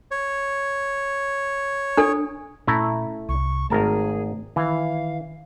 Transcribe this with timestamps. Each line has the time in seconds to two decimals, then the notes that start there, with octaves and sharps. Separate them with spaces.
0.11 C#5
1.97 D4 A4
2.68 A#2 A3 C#4 E4 A#5
3.29 C2 C#6
3.70 G#1 A3 G#4 A#4 A5
4.56 D#3 E3 F5